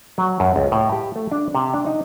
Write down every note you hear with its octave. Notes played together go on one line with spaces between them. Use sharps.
F#3
F#2
C#2
A2
G4
A3
D4
C3
D4
D#4